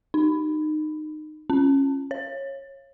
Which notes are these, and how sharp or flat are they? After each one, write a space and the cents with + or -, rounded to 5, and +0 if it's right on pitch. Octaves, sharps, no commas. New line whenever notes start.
D#4 -20
C#4 -15
C#5 -20